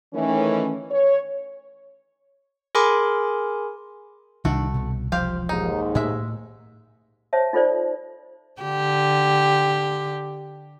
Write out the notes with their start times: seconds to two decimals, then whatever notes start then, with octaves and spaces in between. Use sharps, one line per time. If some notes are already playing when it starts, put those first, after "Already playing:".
0.14 D#3 E3 A3 C#4
0.91 C#5
2.75 G#4 A#4 G#5 B5 C6 D6
4.45 C2 D#3 A3 D4 F#4
4.74 B2
5.12 E1 F3 G4 C5 F5
5.49 D#2 G#2 D#4
5.95 A2 G#3 E5
7.33 C5 C#5 E5 A5
7.53 D#4 F4 A4 C5 D5
8.62 D3 G4